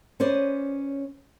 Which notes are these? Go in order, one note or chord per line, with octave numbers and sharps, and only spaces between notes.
C#4 B4 C5 D5